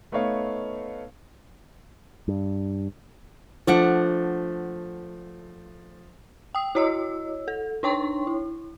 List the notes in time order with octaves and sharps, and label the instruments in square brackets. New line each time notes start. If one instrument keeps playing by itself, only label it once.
[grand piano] A3 B3 D#4 C#5 F5
[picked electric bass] G2
[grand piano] F3 [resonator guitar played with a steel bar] A3 D4 F#5
[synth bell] G5 D#6
E4 F#4 C#5 D#5 E6
A4
D4 D#4 C#5 G5 C6 C#6
E4